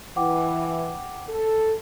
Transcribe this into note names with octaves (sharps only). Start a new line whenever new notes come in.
E3 F#5 G5 D6
A4